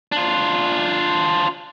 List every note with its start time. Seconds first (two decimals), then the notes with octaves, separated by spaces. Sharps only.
0.12 D4 F4